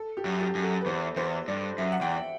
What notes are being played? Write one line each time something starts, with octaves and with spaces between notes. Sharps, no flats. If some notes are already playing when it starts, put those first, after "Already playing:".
Already playing: A4
G4
F#2
G4
F#2
A4
B4
E2 C5
E2 C5
G2 D5
F#2 E5
F#5
E2 G5